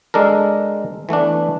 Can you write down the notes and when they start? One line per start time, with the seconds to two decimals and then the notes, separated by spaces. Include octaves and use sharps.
0.14 G#3 D4 A4 A#4
1.09 E3 A3 B3 D4